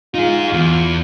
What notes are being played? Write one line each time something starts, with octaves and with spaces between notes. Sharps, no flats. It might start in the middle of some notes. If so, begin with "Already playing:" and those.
D#4 F4 G#4
E2